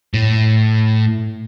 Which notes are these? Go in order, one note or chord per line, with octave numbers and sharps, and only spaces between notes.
A2